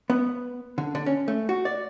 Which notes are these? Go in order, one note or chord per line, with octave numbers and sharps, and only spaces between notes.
B3
D3
D3
C#4
A3
F#4
D5